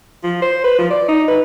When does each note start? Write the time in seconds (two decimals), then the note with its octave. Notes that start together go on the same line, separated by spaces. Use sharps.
0.24 F3
0.42 C5
0.64 B4
0.79 F3
0.90 D5
1.08 D#4
1.28 B4